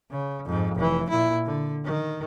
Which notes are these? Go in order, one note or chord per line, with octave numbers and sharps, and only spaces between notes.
C#3
F2 G#2
F1 E3
A#2 E4
D3
D#3